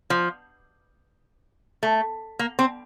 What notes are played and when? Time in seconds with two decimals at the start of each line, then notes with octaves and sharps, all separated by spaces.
0.10 F3
1.83 A3
2.39 A#3
2.59 C4